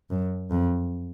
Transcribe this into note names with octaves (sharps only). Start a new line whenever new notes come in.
F#2
F2